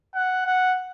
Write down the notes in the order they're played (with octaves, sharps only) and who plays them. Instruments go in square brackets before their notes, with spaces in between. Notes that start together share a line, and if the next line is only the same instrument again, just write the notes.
[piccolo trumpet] F#5
F#5